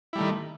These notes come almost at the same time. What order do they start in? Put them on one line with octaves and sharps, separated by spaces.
E4 G3 A3 D#3